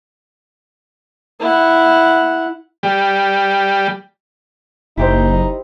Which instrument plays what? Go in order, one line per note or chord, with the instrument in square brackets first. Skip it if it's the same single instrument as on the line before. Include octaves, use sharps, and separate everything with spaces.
[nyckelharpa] E4 F#5
[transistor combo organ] G3
[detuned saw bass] F#1 [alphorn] D#4 [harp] E4 G4 C5